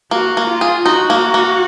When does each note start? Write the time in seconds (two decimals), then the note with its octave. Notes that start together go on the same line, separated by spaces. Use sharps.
0.11 A#3 F#4
0.37 A#3
0.49 F4
0.61 G#4
0.86 D#4 F#4
1.10 A#3
1.34 A#3